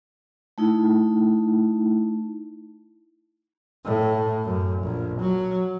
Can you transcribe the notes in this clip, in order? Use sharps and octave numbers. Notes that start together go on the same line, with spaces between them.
A3 D#4 E4
A2
F#2
A#1
F#3